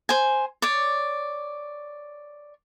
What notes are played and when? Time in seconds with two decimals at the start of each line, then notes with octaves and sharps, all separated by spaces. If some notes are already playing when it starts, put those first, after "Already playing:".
0.09 C5 G#5
0.62 C#5 D5